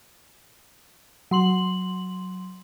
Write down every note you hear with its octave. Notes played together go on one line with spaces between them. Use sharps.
F#3 C6 F#7